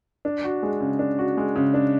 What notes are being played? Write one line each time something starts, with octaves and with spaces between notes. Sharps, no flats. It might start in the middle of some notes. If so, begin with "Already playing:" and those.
D4
F#4
G#3
C#3
D4
F#4
G#3
C#3
D4